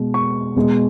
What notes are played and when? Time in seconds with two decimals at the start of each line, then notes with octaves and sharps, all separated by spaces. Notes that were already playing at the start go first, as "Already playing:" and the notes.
Already playing: B2 G#3
0.14 C#6
0.56 B2 G#3